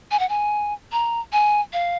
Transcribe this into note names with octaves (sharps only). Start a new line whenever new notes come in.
G#5
F#5
G#5
A#5
G#5
F5